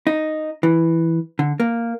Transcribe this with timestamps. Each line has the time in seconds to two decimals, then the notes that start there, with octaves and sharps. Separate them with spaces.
0.07 D#4
0.63 E3
1.39 D3
1.60 A#3